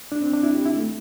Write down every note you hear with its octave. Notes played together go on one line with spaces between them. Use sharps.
D4
C4
D4
E4
G4
E4
A3